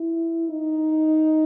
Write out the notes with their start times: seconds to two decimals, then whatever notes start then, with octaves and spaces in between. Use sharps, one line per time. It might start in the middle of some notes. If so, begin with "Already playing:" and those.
Already playing: E4
0.48 D#4